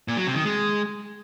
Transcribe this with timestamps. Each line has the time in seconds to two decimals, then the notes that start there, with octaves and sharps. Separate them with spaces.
0.08 A#2
0.17 F#3
0.26 C3
0.36 D#3
0.45 G#3